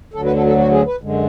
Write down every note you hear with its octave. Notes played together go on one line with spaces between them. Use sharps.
D2 D3 F#3 A4
B4
A4
A4
F#4
G#4
B4
F#2 D3 G#3